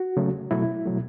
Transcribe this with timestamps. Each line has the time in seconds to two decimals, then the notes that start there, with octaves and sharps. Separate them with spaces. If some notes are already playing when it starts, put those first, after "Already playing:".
Already playing: F#4
0.17 C#3 F#3 A3
0.51 B2 F#3 A3 E4
0.85 B2 F#3 A3